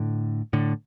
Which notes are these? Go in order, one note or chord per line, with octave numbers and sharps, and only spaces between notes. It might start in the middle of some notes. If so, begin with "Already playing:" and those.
Already playing: A2 D3
A2 D3